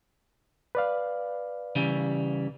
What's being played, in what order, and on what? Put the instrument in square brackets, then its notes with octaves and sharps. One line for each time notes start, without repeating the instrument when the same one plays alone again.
[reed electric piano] B4 D5 F5
[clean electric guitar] C#3 E3 G3